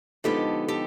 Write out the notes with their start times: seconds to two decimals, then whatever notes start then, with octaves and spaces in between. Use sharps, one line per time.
0.24 D3 F3 G#3 B3 D#4 G4 A4
0.68 G4 A4